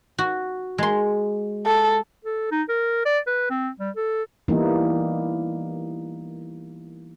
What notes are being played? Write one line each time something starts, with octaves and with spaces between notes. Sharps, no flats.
F#4
G#3 C6
A4
A4
D#4
A#4
D5
B4
C4
G3
A4
E3 G3 A#3 B3 D#4 E4